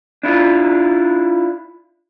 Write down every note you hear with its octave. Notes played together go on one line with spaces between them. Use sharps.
D4 E4 F4